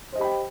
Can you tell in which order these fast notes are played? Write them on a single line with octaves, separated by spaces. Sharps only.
C5 D#5 G4 B5 G5